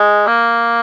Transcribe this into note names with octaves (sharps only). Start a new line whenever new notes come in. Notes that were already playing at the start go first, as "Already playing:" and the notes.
Already playing: G#3
A#3